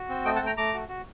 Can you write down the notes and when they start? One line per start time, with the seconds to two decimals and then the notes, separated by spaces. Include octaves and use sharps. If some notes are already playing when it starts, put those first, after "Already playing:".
Already playing: F#4
0.09 C4
0.25 A3 D#5 G5
0.36 F#5 A5
0.42 A3 G5 A#5
0.57 A3 A#5 D6
0.74 F#4
0.89 F#4